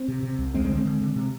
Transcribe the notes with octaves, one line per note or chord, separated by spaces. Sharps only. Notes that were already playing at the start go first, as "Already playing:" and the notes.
Already playing: C4
C3
C3
C2
D#2 G#3 C4
G#3 C4
D3
G#3 C4
D3
D3
C3